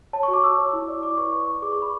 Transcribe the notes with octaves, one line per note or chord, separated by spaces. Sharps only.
C#5 A5
C#6
F#4
D6
F#4 E6
C#5
E4
D5
E4 D6
B4 C#6
D5 C#6
D5
G#4 D6
C#6
G#4
B5